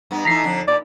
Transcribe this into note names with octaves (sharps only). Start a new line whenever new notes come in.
G2 B3
E3 A3 D#4 A#5 B6 C7
F2 D3 D4
A#2 D5